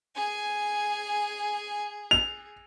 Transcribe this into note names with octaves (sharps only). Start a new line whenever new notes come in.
G#4 G#5
F7